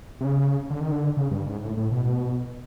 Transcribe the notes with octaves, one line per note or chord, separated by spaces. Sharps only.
C3
C#3
D3
D#3
D3
C#3
G2
G#2
A2
A2
B2